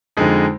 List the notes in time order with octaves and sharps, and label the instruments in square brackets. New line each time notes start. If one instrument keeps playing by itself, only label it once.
[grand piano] F2 D3 G#3 D#4